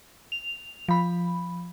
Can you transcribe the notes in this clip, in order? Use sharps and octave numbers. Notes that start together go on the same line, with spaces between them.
F7
F3 B5